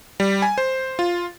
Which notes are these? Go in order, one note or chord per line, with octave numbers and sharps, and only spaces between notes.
G3
G#5
C5
F4